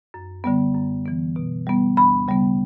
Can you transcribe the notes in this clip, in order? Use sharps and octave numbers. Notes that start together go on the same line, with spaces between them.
F#2
D3 G3 B3
F#2
E3 B3
B2
G3 B3
D2 B5
C#3 G3 B3